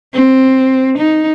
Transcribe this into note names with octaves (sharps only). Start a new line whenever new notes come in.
C4
D#4